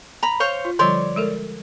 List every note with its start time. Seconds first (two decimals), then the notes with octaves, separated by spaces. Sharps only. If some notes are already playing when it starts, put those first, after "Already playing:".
0.23 A#5 B5
0.40 C5 C#5 F5
0.65 F4
0.79 D3 F3 G3 C#5 D5 C6
1.16 G#3 A4 A#4